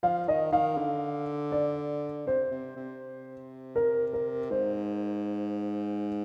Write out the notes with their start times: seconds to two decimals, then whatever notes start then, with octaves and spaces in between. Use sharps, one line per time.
0.03 F3 F5
0.28 D#3 D#5
0.53 D#3 F5
0.77 D3
1.52 D5
2.27 C3 C5
2.51 C3
2.76 C3
3.76 A#4
4.13 A#4
4.50 G#2 C5